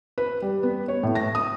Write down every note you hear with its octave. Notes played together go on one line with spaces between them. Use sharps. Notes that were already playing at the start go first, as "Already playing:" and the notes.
B4
G3
B3
C#5
A2
A#6
D#6